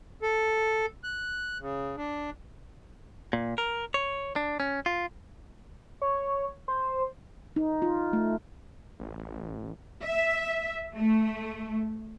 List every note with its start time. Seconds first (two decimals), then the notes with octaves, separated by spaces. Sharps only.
0.22 A4
1.04 F#6
1.60 C#3
1.97 D4
3.33 A#2
3.58 A#4
3.94 C#5
4.36 D4
4.60 C#4
4.86 F4
6.02 C#5
6.68 C5
7.56 D#4
7.82 F4
8.13 A3
9.00 A1
10.02 E5
10.96 A3